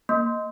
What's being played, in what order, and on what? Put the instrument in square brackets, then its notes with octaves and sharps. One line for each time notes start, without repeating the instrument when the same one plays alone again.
[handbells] A#3